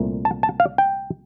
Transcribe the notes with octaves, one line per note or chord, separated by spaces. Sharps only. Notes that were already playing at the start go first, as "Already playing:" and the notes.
Already playing: C2 A#2 A3
A5
A5
F5
G5